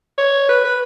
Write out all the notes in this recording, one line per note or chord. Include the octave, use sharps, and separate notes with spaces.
C#5
B4
B4